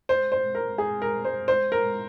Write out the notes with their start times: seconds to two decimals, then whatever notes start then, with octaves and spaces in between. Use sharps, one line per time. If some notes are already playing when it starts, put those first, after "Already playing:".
0.09 C5
0.32 C5
0.55 A#4
0.78 G#4
1.02 A#4
1.25 C5
1.48 C5
1.72 A#4